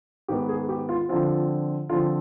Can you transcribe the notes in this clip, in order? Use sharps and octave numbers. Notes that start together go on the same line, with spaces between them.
G#2 D#3 B3 G4
G#4
G4
F4
D3 F3 C4 F4
D3 F3 C4 F4